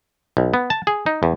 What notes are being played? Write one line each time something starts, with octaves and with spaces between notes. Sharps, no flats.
B1
B3
A5
G#4
D#4
E2